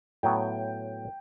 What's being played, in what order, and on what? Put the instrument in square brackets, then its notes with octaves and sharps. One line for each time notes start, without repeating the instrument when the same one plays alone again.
[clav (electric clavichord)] A2 F#3 B3 [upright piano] G5